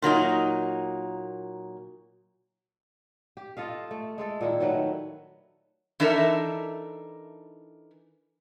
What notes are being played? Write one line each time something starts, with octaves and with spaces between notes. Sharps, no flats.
A#2 F#3 A#3 D#4
G4
F4 A4 D#5 F5
A3
G#3 A3 A4
A#2 D#3 E4
D#3 F#3 A3 B4
E3 D4 D#4 A4 A#4 E5